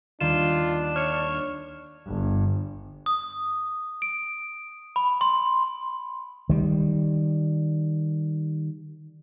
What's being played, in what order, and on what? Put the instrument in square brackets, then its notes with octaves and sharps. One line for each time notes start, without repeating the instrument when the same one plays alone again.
[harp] D#2 D#3 G3 [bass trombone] D4 [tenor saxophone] F4 [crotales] E7
[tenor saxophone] C#5 [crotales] F6 E7 [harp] C#7
[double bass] G1
[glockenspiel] D#6
D7
B5
C6
[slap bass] D#3 G3